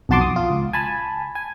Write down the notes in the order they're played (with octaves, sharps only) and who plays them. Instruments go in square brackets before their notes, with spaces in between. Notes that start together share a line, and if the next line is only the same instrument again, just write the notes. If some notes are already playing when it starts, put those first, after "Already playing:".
[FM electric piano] B1 F2 F#4 A5 C6 D6
D#6
F4
C#2
G#5 A5 B5
G#5